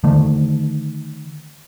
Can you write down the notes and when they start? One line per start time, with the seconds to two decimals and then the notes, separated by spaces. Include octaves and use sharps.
0.04 D3 D#3 A3